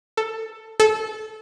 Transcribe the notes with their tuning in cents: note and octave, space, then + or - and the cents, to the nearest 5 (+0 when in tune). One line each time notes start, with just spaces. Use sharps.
A4 +10
A4 -20